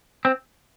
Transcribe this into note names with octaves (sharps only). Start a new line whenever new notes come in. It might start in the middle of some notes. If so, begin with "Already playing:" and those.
C4